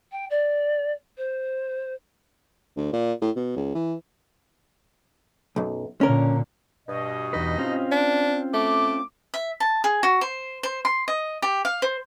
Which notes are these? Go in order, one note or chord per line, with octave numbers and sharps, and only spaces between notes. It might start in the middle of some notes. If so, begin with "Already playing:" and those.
G5
D5
C5
D2
A#2
A2
B2
C#2
E3
B1 F#2
A#2 D3 C#4 A#4
G2 B2 D#5
E2 D#4 B4
C4 C#4 F4
D4
A3 D6
E5
A5
G#4
F#4
C5
C5
C6
D#5
G4
F5
C5